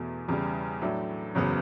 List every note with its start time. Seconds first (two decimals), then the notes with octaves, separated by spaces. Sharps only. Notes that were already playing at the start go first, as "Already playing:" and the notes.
Already playing: E2 B2 A3
0.28 E2 C#3 G3
0.81 A2 F#3 A3 D4
1.35 F#1 E2 C#3 F#3 B3